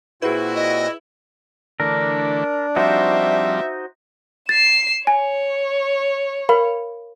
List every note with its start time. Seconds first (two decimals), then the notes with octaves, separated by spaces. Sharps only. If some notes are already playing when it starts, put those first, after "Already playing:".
0.22 A#2 C4 E4 F#4 G#4 B4
0.56 D#5
1.80 D3 E3 A3 D4 A#4
2.76 F3 G3 C4 D#4 F#4 C5 E5
4.49 A6 C7 E7
5.07 C#5 G#5
6.49 A#4 F5 B5